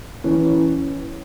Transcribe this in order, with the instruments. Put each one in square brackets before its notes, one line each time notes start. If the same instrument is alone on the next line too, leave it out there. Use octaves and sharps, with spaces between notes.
[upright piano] E3 C#4